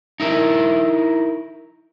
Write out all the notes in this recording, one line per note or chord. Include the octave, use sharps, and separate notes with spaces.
D#4 E4 A#4